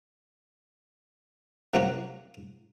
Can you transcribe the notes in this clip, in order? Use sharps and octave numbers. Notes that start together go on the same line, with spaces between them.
C3 F#3 A#3 C#4 F#4